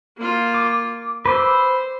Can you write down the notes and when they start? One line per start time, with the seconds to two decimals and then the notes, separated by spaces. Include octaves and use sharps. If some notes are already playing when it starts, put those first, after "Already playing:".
0.18 A#3 F4
0.54 D6
1.26 B4 C5 D6 E6